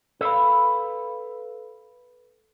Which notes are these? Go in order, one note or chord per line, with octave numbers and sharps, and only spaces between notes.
A4 B4 E5 F5 B5